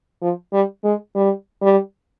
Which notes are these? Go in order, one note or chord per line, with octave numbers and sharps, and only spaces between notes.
F3
G3
G#3
G3
G3